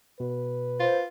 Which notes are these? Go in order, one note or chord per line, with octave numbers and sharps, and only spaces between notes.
B2 B4
F4 C5